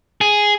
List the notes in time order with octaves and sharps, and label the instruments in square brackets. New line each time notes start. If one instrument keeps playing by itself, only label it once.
[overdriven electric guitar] G#4